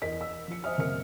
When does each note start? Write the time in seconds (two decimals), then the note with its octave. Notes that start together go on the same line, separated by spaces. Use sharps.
0.02 E2 A#4 D#5 B6
0.21 E6
0.48 F3 C#7
0.64 C5 D#5 E5 G#5 D#6 F6
0.78 F#1 C4 A#4 F6 C#7